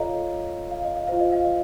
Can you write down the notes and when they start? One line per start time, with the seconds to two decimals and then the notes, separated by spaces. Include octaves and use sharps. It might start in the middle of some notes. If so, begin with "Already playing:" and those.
Already playing: F4 A4 C#5 D#5 F5 A#5
0.71 F5
0.84 D#5
0.97 F5
1.08 F4 C5 F5
1.21 D#5
1.33 F5
1.45 D#5